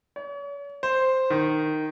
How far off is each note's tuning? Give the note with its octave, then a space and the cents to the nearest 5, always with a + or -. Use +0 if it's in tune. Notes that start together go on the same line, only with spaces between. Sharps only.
C#5 +40
C5 +0
D#3 -10